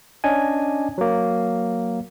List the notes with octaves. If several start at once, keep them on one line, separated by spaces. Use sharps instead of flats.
C#4 D4 D#5 G#5
F#3 A#3